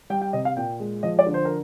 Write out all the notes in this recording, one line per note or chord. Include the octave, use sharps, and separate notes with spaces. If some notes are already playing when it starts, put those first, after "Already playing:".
G3 G5
G5
C3 D#5
F5
A#2 G5
G#3
F3 D#5
D5
D3
C5
A#4